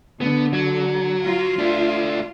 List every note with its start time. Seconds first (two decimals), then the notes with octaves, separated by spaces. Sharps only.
0.21 D3 B3
0.53 F#3
1.25 F4
1.59 A3 D4